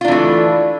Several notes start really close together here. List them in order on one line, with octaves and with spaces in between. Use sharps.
F4 D4 E3 A3